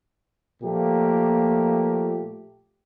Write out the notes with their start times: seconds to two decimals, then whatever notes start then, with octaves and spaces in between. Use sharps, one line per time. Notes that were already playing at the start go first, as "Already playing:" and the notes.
0.63 A#2 F3 A3 A#3 G4